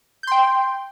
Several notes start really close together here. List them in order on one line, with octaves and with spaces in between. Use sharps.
G6 C6 G5